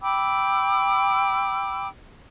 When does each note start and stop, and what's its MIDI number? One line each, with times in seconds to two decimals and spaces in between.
0.01 1.88 79
0.01 1.88 83
0.01 1.88 86
0.01 1.88 88